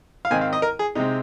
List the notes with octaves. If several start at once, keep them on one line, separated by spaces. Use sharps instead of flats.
F5
G#2 D#3 C4 G#5
F5
D#5
A#4
G#4
C3 G#3 C4 D#4